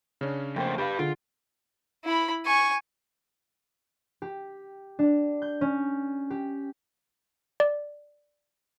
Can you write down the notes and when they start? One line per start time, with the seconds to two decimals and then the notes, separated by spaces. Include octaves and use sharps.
0.21 C#3 C#4 D4
0.56 F2 A3 A#3 C4 G5
0.78 G4 B4 F5 B5
0.99 D3 F4 G#4 D7
2.04 E4 B5
2.46 G#5 C#6
4.22 G4
4.99 D4
5.42 G6
5.61 C#4
6.30 G4
7.60 D5